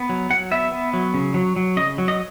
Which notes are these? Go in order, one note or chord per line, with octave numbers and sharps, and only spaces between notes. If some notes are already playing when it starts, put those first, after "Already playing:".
Already playing: B3
F#3
F#3 F#5
B3 E5
B3
F#3
C#3
F#3
F#3
C#3 D#5
F#3
D#5